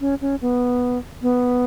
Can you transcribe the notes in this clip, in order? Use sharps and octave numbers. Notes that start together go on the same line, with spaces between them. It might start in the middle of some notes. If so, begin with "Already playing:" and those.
C#4
C#4
B3
B3